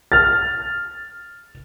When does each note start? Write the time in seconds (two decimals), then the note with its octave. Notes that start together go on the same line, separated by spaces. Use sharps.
0.12 F6 A6